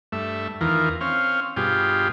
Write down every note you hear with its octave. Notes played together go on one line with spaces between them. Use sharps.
G2 A3 E5
E2 D#3 E3 F4 A#4
C4 C#4 F5
G2 B2 F4 G4 G#4